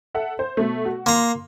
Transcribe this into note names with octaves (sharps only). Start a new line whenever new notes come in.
A4 E5 F#5
C5
B2 A3
F#4
A#3 A#5 C6